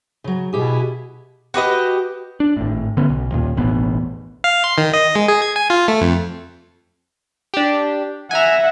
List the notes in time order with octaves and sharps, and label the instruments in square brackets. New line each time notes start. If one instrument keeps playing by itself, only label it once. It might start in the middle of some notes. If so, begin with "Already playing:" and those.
[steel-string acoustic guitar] C#3 F#3
[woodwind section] B2 [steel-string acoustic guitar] E4 G4 G#4
[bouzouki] F#4 G4 B4 D#5
[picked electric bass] D4
G#1 A2
D3 B3 C#4
B1
D#2 A#2
E1 A1 B3
[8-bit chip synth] F5
C6
D#3
D#5
G#3
G#4
G#6
G#5
F4
A3
F2
[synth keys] D4 G4
[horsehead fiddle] E5 F#5 [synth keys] G#5 A#5